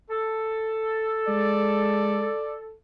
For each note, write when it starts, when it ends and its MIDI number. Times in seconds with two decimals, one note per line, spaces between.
0.10 2.72 69
1.28 2.29 56
1.28 2.55 74